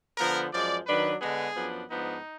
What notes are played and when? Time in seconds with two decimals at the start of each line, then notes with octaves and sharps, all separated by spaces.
0.18 D3 F3 B3 A#4
0.52 F#2 F3 G#3 D5
0.87 D#3 F#3 D4 B4
1.21 D3 G#3 B3 D4 G#4
1.55 F#2 F3 B3 D4
1.90 G#2 F3 B3 D4 D#4